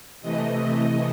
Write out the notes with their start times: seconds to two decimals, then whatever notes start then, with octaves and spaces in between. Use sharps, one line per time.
0.22 C3 E3 A3 D#5